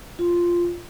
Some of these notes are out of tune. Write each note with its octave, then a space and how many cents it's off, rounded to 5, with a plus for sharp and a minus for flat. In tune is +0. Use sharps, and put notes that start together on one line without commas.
F4 -5